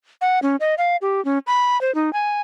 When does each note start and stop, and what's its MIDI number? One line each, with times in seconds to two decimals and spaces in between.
0.21 0.39 78
0.42 0.56 61
0.60 0.75 75
0.78 0.97 77
1.02 1.23 67
1.25 1.39 61
1.47 1.80 83
1.81 1.93 72
1.95 2.13 63
2.13 2.41 80